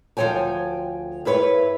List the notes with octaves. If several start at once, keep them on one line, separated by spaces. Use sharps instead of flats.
D2 F3 F#3 C#5 G5 G#5
G2 E4 B4 C#5